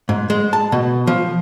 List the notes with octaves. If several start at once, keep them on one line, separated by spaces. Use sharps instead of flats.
G#2
G#3
A5
B2
F3